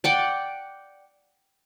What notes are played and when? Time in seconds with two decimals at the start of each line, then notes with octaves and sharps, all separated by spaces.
0.04 D5 F#5 G5